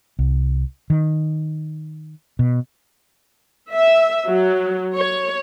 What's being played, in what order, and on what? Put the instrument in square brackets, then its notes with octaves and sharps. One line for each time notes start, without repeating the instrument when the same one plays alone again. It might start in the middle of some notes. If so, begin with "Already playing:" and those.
[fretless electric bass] C2
D#3
B2
[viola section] E5
F#3
C#5